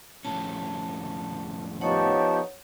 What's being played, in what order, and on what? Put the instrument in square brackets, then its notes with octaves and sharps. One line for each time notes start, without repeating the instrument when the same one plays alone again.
[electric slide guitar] F2 A2 C#4 [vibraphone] A5
[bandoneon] F3 B3 D#4 [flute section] G4 A5 C#6 [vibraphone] C#5 F#5